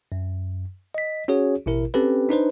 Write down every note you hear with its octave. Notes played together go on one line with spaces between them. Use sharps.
F#2
D#5 B6
C#4 F#4 G#4 C#5
A1 B2 E4 A#4
C4 C#4 G4 A4 B4
D4 D#4 B4 C5